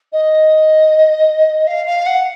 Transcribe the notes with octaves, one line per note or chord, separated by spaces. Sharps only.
D#5
F5
F5
F#5